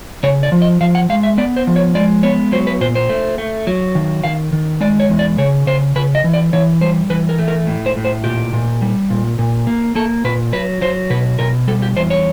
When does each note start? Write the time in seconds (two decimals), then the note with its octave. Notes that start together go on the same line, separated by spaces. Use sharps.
0.23 C#3 C#5
0.43 D5
0.52 F3
0.62 D#5
0.81 F3 F5
0.95 F#5
1.09 G#3 F5
1.23 E5
1.38 B3 D5
1.56 C5
1.67 F3
1.76 C#5
1.95 G#3 D5
2.23 B3 C#5
2.52 F#3 C5
2.67 B4
2.81 A#2 C5
2.95 C5
3.09 A3
3.38 A3
3.67 F#3
3.95 D#3
4.24 D#3 F5
4.53 D#3
4.81 G#3 D5
5.00 C#5
5.09 E2
5.19 D5
5.38 C#3 C#5
5.67 C#3 C5
5.96 C#3 B4
6.15 D#5
6.24 E3
6.33 D5
6.53 E3 C#5
6.81 G3 C5
7.10 E3 B4
7.29 A#4
7.39 A3
7.48 A#4
7.67 A2
7.86 C5
7.96 A2
8.05 C5
8.24 A#2 G4
8.53 A#2
8.82 G3
9.10 A#2
9.39 A#2
9.67 A#3
9.95 A#3 A4
10.24 A#2 B4
10.53 F#3 B4
10.81 F#3 C5
11.10 B2 B4
11.39 B2 A#4
11.67 G3 A4
11.82 G4
11.96 E2 C5
12.10 C#5